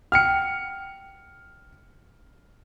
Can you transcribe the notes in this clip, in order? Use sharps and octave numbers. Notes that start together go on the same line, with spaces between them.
F#5 G5 F6 C#7